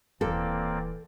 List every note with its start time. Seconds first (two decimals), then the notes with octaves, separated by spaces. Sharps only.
0.21 D#1 E3 A#3 C4 E4 A4 D5